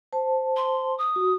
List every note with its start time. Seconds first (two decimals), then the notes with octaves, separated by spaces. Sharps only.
0.13 C5 A5
0.56 C6
0.98 D#6
1.16 F#4